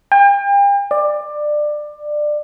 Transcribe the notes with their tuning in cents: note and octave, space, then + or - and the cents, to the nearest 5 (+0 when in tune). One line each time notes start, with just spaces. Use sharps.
G5 +40
D5 +20